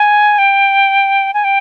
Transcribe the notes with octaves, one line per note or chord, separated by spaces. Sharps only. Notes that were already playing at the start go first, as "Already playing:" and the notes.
Already playing: G#5
G5
G#5
G5